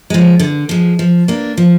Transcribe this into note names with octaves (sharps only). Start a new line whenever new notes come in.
F3 G#3
D3
F3 G#3
F3
A#3 D4
F3